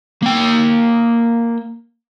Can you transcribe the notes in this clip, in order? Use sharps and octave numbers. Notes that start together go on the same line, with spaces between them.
A#3 G5